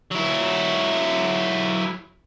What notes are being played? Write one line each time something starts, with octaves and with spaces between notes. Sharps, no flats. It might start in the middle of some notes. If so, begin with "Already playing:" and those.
F#3 E4